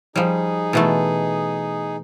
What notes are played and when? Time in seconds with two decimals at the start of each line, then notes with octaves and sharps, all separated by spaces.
0.16 F3 G3 D#4 G#4
0.73 B2 E3 A3